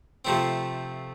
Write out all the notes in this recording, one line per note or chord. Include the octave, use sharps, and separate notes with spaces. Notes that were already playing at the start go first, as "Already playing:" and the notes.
C3 F3 A3 C4